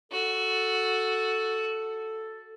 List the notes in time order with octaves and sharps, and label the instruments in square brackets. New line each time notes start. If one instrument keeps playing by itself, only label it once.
[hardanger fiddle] F#4 [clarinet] A4